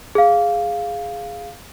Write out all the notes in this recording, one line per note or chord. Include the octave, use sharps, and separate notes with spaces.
G#4 F5